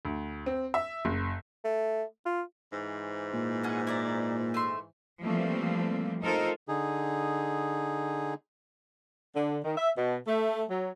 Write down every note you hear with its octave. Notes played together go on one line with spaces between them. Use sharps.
D2
C4
E5
F#1
A3
F4
G#2 E3 C5
A#2
C#4 G#4 F#5
E4 D5 A#5
A3 E5 C6
E3 F3 G3 A3 A#3 C4
D#4 F4 A4 A#4 C5
D3 D#4 G#4
D3
D#3
E5
B2
A3
F#3